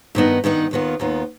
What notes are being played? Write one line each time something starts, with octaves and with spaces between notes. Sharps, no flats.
G2 D#3 B3 D#4
G2 D#3 B3 D#4
D#2 D#3 B3 F4
D#2 D#3 B3 F4